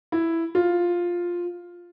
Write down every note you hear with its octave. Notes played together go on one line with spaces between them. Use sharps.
E4
F4